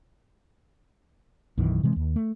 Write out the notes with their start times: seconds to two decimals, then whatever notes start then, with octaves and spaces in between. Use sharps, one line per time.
1.57 B1 F#2 D#3 E3
1.83 C3 E3 G#3 C4
1.96 D#2
2.16 A3